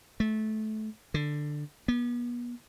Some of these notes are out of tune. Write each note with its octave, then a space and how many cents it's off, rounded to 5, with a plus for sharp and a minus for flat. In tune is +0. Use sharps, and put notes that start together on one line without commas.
A3 -20
D3 +10
B3 -35